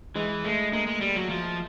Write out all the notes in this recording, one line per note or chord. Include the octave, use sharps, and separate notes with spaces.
E3 G#3
G#3 A3
G#3 A#3
G#3
G3
F#3
F3